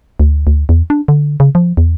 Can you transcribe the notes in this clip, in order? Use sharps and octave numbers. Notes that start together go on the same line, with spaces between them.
D2
D2
E2
D4
D3
C#3
F3
E2